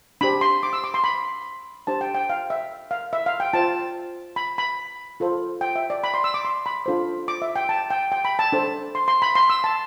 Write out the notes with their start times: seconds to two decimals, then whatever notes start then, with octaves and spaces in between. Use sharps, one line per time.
0.21 D4 G4 C5 B5
0.41 C6
0.63 D6
0.73 E6
0.84 D6
0.94 C6
1.04 B5
1.87 D4 G4 C5 A5
2.01 G5
2.15 G5
2.30 F5
2.50 E5
2.91 F5
3.13 E5
3.26 F5
3.40 G5
3.53 F4 C5 A5
4.36 B5
4.58 B5
5.20 F4 A4 C5
5.61 G5
5.76 E5
5.90 D5
6.04 B5
6.14 C6
6.24 E6
6.34 D6
6.45 C6
6.66 B5
6.86 D4 F4 A4 C5
7.28 D6
7.42 E5
7.56 G5
7.69 A5
7.90 G5
8.12 G5
8.25 B5
8.39 A5
8.52 D4 A4 C5
8.95 C6
9.08 C6
9.22 B5
9.35 C6
9.50 E6
9.64 A5